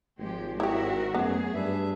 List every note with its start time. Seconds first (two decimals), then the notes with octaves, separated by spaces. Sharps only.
0.19 G#1 F3 G#3 G4
0.60 E4 F#4 G4 A#4 E5
1.14 F#2 A3 B3 G#4
1.54 G2 D4 B4 E5